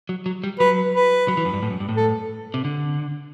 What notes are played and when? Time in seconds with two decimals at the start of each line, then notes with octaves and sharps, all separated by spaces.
0.09 F#3
0.26 F#3
0.44 G3
0.60 F#3 B4
0.95 B4
1.28 F#3
1.37 E3
1.45 F#2
1.53 G2
1.62 A2
1.71 F#2
1.80 G2
1.89 A2
1.96 A4
2.54 C3
2.65 D3